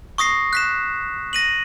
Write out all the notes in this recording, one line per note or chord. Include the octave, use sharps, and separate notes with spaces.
C#6 D#6 A#6 C7
F#6 B6 E7
A#6 D#7 F#7